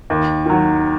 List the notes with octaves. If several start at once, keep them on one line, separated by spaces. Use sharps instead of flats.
D#2
D#3 F#3